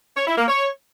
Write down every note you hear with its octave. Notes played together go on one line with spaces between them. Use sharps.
C#5
E4
A#3
C#5